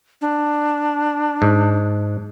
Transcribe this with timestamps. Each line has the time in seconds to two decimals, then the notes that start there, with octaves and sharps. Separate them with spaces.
0.21 D4
1.42 G#2